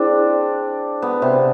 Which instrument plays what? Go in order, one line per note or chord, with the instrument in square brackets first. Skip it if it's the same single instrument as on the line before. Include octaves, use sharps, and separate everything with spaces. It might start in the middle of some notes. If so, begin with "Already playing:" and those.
Already playing: [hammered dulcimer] C4 D4 [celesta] E4 G#4
[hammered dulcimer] B3
C3